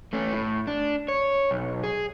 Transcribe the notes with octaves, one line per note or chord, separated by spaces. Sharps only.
A3 C#4
A2
D4
C#5
B1
G#4